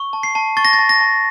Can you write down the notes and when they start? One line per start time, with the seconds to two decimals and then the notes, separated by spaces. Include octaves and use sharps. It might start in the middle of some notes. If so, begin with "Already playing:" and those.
Already playing: C#6
0.13 A5
0.23 C7
0.35 A5
0.57 C#6 A6
0.65 A#6
0.73 A6
0.79 A5
0.89 A#6
1.01 A5